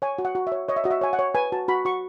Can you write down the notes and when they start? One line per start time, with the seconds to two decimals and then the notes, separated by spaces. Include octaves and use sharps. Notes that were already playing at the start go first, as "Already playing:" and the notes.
0.02 C#5 G#5
0.18 F#4
0.25 F#5
0.35 F#4
0.47 C#5 E5
0.68 C#5 D#5
0.76 E5
0.84 F#4 D#5
0.91 E5
1.01 C#5 G#5
1.13 F#5
1.19 C#5
1.35 B4 G#5
1.52 F#4 A5
1.68 F#4 B5
1.85 F#4 C#6